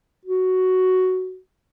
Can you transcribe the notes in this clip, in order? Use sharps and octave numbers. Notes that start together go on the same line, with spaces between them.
F#4